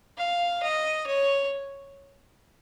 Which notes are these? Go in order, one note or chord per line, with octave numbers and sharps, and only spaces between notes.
F5
D#5
C#5